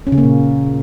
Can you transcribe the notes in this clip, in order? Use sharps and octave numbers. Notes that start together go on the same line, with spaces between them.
C#4
C#3
A#3
A#2